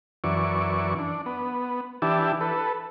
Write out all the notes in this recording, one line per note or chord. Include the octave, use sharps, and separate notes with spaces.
F#2 E3 D5 C#6
D4
B3
E3 D4 E4 G4 A5
A4 B4